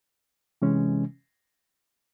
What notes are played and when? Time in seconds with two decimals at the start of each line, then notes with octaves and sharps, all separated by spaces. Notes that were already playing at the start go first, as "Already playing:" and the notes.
0.62 C3 E3 G#3 C#4